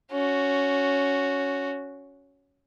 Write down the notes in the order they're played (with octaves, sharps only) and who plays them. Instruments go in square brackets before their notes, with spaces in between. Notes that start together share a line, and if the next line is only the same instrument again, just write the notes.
[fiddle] C#4 F#4